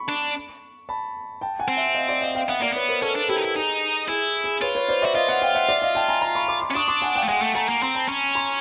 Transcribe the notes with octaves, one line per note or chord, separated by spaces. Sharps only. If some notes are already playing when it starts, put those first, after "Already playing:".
Already playing: B5 C#6
D4
A5 B5
G5 A5
F#5 G#5
C4
E5 F#5
D#5 F5
D5 E5
D#5 F5
F5 G5
B3 E5 F#5
A#3 D5 E5
B3 B4 C#5
A#4 C5
C#4 A4 B4
D4
E4 G4 A4
D#4
E4
D#4 G#4
E4 G#4
G#4
F4 B4 C#5
B4 C#5
C5 D5
F#4 D5 E5
F4 D#5 F5
E5 F#5
F5 G5
E5 F#5
D5 E5
D#5 F5
G5 A5
G#5 A#5
A#5 C6
B5 C#6
C6 D6
C6 D6
C#4
D4 C#6 D#6
C6 D6
F#5 G#5
F5 G5
A3
G#3 F#5 G#5
A3
A3 G#5 A#5
A#3
C4 A#5 C6
A5 B5
C#4 A5 B5
A#5 C6